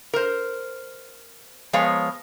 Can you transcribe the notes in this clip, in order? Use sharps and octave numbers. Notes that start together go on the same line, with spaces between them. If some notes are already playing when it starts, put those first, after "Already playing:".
A#4 C5
F3 G#3 B3 C#5 F5